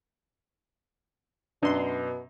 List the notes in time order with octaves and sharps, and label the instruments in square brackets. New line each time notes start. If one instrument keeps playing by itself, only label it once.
[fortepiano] F#2 [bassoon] B2 [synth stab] D4 C6